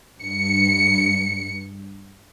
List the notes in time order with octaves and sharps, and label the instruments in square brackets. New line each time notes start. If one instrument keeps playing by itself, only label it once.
[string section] G2 C#7